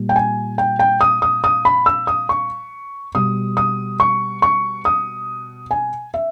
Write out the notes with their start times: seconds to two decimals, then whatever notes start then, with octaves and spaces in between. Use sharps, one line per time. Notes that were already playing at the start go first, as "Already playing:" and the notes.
Already playing: A#2 G3
0.09 G5
0.16 G#5
0.58 G5
0.79 G5
1.01 D#6
1.22 D#6
1.44 D#6
1.65 B5
1.86 E6
2.07 D#6
2.29 C#6
3.15 B2 G3 D#6
3.57 D#6
4.00 C#6
4.42 C#6
4.85 D#6
5.71 G#5
6.14 E5